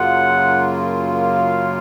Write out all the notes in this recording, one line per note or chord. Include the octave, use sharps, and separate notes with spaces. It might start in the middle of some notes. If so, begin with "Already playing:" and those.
Already playing: F#2 C#3 F#3 A#3 F4 F#5
F5